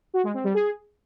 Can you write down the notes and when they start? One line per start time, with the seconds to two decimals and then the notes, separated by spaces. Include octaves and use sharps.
0.14 F#4
0.24 G#3
0.34 C4
0.44 G3
0.54 G#4